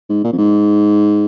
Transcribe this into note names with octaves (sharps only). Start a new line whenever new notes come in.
G#2
A#2
F2
G#2